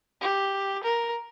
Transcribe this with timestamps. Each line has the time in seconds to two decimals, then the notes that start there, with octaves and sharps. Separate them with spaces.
0.21 G4
0.83 A#4